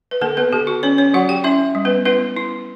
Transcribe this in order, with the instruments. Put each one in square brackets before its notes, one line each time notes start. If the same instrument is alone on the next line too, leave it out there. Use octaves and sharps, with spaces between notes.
[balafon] B4
D3 A#3 A#4
B3 B4
D3 G4
F#4
C#4 C#5
C#4 C#5
F#3 F#4 F#5
G4 G5
C#4 E4 E5
G3
B3 B4
B3 E4 B4
E4